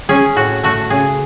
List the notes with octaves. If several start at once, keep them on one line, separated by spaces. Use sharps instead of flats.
C#4 G#4
A2 F#4
A3 F#4
C#3 G#4